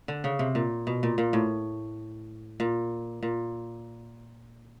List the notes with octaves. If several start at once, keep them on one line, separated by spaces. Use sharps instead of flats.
D3
C#3
C3
A#2
B2
A#2
A#2
A2
A#2
A#2